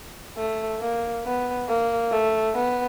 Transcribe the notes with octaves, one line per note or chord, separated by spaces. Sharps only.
A3
A#3
B3
A#3
A3
B3